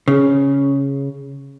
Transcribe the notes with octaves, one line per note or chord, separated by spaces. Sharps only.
C#3